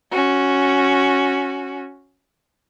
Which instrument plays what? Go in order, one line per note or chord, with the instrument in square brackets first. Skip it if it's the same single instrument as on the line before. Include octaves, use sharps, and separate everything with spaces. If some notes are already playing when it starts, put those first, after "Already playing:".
[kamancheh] C#4 F#4